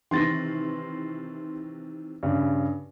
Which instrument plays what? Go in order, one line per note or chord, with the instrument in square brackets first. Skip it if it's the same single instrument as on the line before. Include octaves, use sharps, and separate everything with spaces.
[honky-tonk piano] C3 D#3 E3 [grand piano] C6 A6 A#6
[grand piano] G2 C#3